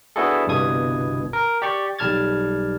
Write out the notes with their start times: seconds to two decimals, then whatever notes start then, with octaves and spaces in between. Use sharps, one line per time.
0.16 B3 D4 E4 F#4 G#4 A4
0.47 G1 C2 G2 B2 D#6 G#6
1.33 A#4
1.62 G4 D5 C#6
1.99 B1 G3 A5 F6 G#6 A6